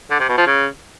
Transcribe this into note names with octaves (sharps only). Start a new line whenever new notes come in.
D3
C3
B2
F3
C#3